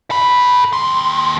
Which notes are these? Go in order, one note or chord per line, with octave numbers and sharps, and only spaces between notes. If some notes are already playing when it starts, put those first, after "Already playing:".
A4 B5
D#2 C6